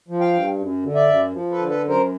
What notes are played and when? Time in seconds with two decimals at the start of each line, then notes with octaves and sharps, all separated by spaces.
0.08 F3
0.20 F5 G5
0.33 G2
0.58 F#2
0.83 D3
0.95 D5 E5
1.08 F#2
1.32 F3
1.51 A4 B4
1.58 D3
1.69 A4 B4
1.83 F#2
1.89 A#4 C5